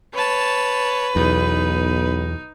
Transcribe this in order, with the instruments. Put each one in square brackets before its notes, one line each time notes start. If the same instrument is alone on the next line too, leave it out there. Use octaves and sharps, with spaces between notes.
[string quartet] B4 [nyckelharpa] C#5 A5
[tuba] B1 [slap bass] E2 [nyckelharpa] D#4